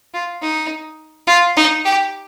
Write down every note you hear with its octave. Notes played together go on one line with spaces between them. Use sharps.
F4
D#4
F4
D#4
G4